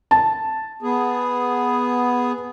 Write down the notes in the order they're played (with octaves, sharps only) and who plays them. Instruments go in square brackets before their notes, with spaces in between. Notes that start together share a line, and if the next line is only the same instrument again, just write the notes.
[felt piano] A5
[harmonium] B3 G#4